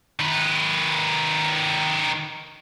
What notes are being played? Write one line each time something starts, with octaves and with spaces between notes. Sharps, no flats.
D#3 B4